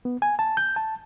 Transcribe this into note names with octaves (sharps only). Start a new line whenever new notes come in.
B3
G#5
A5
G6
A5